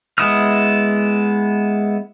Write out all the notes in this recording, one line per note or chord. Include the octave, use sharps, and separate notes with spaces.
G#3 B3 E4 D#6 F6